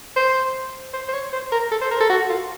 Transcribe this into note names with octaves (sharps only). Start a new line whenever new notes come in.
C5
C5
C5
C#5
C5
A#4
A4
C5
A#4
A4
F#4
F4